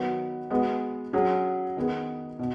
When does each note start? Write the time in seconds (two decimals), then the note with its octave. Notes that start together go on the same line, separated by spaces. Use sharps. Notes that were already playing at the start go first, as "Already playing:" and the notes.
Already playing: D#3 F#3 B3 F#4 B4
0.50 G#3 B3 F#4 B4
1.13 F#3 C#4 G#4
1.77 D#3 B3 G#4 B4
2.39 B2